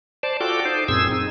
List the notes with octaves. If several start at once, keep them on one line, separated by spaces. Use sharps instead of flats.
C5 D5 A5
F4 F#4 A4 G5 D6
D#4 C5
F#2 A#2 C4 G#4 E6
D#4